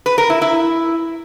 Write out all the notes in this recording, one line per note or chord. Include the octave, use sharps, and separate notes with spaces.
B4
A#4
E4
E4